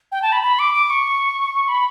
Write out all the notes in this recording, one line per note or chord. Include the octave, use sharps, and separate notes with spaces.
G5
A5
B5
B5
D6
D6
C#6
B5